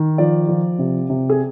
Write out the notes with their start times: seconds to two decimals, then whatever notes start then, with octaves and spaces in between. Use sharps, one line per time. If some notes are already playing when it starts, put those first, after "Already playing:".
Already playing: D#3
0.18 F3 D5
0.48 F3
0.79 C3
1.10 C3
1.30 G#4